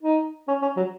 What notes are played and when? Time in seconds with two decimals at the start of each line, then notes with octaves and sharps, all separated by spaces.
0.03 D#4
0.48 C#4
0.62 C#4
0.76 F#3